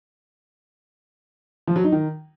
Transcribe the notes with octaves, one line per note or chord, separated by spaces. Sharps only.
F3
F#3
D#4
D#3